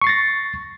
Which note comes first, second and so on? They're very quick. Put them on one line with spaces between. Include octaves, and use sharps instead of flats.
C#6 C7 A6 A#6